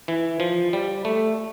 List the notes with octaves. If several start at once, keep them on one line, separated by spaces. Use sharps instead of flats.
E3
F3
G3
A3